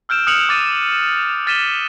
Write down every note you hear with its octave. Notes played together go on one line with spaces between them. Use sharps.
E6 F6 G6 D7 E7
D#6 F6 F#6 C#7 F7 F#7
D6 A6 D#7
F6 A6 B6 D#7 E7 G7